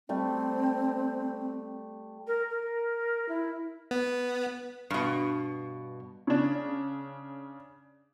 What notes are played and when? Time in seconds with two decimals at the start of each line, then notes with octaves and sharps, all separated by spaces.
0.09 G3 A3 C4
2.27 A#4
2.50 A#4
3.29 E4
3.91 B3
4.90 G2 B2
6.27 C#3 D4